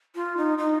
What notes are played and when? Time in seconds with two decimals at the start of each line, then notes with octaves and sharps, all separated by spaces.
0.15 F4
0.37 D#4
0.58 D#4